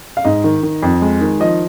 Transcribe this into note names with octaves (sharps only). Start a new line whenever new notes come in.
F5
G#2 D#5
D#3
D#3
F2
G#3
D#3
F3 D#5